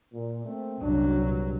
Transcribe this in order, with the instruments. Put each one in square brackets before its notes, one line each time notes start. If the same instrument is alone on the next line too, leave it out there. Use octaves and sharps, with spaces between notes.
[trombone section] A#2
A3 A#3 C4
[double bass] C2 F#3 [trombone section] F#2 D4
[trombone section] A#1 G2